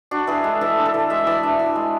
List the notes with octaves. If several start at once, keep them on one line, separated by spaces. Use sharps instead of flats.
D4 F#4
E3 G#4
G#3 A4
E3 A4
D4
A4
E3
G#3 E5
E3 D5
D4 E5
E3
G#3